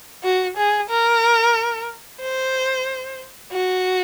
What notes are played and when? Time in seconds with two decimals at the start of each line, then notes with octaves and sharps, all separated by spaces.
0.24 F#4
0.57 G#4
0.90 A#4
2.21 C5
3.52 F#4